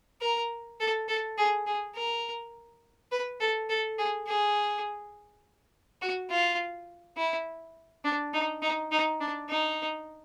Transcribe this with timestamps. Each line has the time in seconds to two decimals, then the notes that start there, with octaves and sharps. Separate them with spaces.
0.21 A#4
0.80 A4
1.08 A4
1.38 G#4
1.67 G#4
1.95 A#4
3.12 B4
3.40 A4
3.69 A4
3.98 G#4
4.27 G#4
6.02 F#4
6.30 F4
7.17 E4
8.04 D4
8.34 D#4
8.62 D#4
8.92 D#4
9.20 D4
9.49 D#4